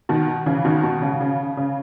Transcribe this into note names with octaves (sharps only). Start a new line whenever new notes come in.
B2 D#3
C#3 E3
B2 D#3
B2
C#3
C#3
C#3